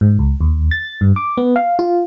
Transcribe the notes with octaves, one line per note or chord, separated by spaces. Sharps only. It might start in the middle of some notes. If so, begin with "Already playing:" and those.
G#2
C#2
D#2
A6
G2
D6
B3
F5
F4